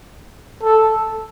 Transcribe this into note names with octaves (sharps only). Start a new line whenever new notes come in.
A4